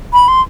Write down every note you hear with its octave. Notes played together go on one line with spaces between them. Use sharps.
B5
C6